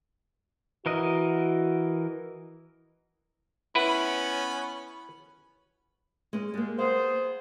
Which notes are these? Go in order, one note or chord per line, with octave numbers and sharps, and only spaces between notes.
E3 F#4 A#4 D#5
B3 C#4 E4 B4 F#5 B5
G#3 C#4
G3 G#3 A#3
B3 G#4 C5 F5